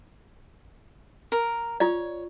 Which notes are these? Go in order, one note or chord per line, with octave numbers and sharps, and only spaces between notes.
A#4
F4 C#5 D5